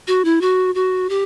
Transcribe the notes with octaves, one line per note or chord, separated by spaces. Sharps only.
F#4
E4
F#4
F#4
G4